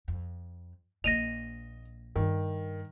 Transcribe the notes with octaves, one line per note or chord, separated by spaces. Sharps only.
F2
A#1 A#3 D#5 A#6 D#7 F7
G2 D#3